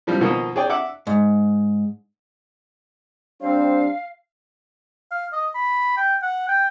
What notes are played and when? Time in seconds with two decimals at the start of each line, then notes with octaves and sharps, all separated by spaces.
0.07 A2 F3 G3
0.21 B2 D#3 F3 A#3 D#4
0.56 G#4 C#5 D5 G5
0.70 E5 F#5 D6
1.07 G#2
3.41 G3 C4 D4 C5 F5
5.11 F5
5.33 D#5
5.55 B5
5.97 G5
6.22 F#5
6.48 G5